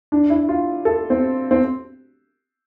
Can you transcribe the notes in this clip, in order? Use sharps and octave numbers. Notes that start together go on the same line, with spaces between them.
D4
E4
F4
A4
C4
C4